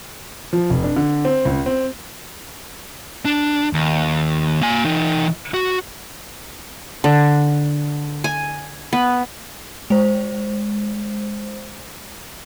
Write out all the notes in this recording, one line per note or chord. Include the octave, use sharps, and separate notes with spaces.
F3
F1
D4
D3
C4
C#2
C4
D4
D#2
A#3 G#5
E3 D#4
F#4
D3
G#5
B3
G#3 C5